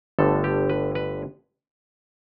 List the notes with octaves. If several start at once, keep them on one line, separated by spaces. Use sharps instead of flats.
G1 G2 D3 A3 A4
G4
B4
B4